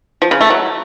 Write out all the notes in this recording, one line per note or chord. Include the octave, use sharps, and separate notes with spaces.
F3
C#3
A3
F#3